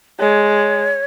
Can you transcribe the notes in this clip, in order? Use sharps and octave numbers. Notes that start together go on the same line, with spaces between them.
G#3 C#5